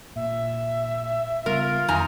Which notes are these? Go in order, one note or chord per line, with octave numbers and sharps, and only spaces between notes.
A#2 E5
C#3 G3 B3 F4 A#4
F2 D#3 F#3 D#4 G#5 A#5